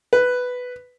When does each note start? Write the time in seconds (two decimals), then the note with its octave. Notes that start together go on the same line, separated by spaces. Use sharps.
0.13 B4